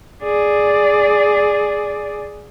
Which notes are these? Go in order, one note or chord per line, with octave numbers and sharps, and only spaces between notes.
G#4 D5